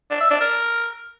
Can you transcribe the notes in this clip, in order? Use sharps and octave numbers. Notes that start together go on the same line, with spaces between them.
D4
E5
D4
A#4